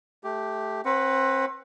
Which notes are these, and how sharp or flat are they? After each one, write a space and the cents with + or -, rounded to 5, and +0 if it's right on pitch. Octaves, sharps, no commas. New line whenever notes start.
A3 -15 G4 +0
C4 +35 B4 +0 F#5 +0